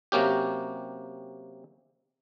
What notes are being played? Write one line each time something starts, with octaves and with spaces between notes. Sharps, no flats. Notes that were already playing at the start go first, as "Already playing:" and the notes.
C3 F#3 A#3 C#4 G4